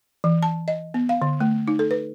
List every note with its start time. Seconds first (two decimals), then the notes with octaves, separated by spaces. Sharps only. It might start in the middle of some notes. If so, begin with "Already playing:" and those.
0.24 E3
0.43 A5
0.68 D#5
0.94 B3
1.09 F5
1.22 D3
1.40 A3
1.68 D#4
1.79 A4
1.91 B4